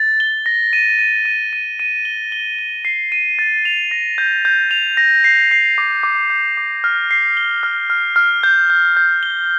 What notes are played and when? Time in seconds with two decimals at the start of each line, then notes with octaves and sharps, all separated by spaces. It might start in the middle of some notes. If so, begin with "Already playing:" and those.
Already playing: A6
0.20 G7
0.46 A#6
0.73 D#7
0.99 D#7
1.25 D#7
1.53 D#7
1.80 D#7
2.05 G7
2.32 G7
2.59 G7
2.85 C7
3.12 D#7
3.39 A6
3.65 F7
3.91 A#6
4.18 G6
4.45 G6
4.71 F7
4.97 A#6
5.24 C7
5.51 C7
5.78 D6
6.03 D6
6.30 G6
6.57 D6
6.84 F6
7.11 C7
7.37 G7
7.63 F6
7.90 F6
8.16 F6
8.43 G6
8.70 G6
8.97 G6
9.23 G7